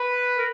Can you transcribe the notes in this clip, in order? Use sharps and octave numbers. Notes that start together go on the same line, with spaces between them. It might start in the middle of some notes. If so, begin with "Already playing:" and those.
Already playing: B4
A#4